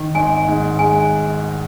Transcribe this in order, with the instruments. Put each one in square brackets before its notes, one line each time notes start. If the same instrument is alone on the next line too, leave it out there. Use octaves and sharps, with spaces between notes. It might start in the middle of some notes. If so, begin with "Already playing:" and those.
Already playing: [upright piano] D#3
[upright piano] G#1 [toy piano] G#5
[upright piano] G#2
[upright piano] G#3 [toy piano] G#5